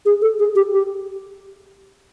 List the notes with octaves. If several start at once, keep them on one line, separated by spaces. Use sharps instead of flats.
G#4
A4
G#4
G4
G4